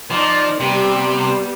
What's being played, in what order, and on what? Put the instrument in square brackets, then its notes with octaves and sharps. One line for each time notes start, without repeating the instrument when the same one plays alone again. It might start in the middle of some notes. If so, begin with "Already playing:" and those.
[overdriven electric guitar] F3 [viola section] D#4 D5
[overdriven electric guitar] C3 [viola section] G3 B3